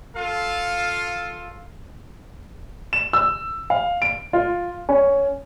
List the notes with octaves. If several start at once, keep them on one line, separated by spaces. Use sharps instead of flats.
F4 A4 F5
E7
E6
F5
D7
F4
C#4